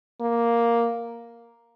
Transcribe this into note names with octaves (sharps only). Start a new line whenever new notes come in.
A#3